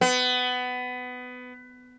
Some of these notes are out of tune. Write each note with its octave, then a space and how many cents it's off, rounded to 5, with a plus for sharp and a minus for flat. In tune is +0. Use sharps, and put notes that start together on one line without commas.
B3 +20